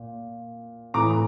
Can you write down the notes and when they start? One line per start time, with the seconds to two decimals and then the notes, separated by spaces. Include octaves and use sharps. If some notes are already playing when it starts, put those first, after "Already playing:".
Already playing: A#2
0.94 A2 E3 A#5 D6